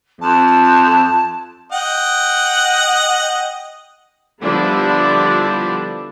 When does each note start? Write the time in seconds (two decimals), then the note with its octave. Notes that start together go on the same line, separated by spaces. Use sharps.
0.21 F2 A5
1.72 D#5 F#5 G5
4.42 D3 F3 G3 B3 D4 E4